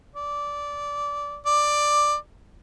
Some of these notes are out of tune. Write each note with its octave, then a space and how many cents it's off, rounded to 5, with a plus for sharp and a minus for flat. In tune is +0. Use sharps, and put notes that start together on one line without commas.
D5 -15
D5 +10